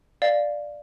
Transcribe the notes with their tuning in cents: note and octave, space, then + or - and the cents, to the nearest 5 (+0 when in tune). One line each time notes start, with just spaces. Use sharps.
D5 +5 F5 +0